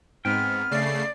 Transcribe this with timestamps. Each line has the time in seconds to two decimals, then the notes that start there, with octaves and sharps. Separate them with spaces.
0.25 G#2 B3 C4 G5 F6
0.71 C#3 A3 D5 C7